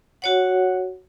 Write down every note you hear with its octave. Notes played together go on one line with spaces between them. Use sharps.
F#4 C#5 F#5